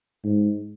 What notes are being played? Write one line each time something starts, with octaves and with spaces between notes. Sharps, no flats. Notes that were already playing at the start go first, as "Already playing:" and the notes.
G#2